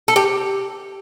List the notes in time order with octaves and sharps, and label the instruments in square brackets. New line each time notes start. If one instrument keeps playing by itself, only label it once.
[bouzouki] A4
G4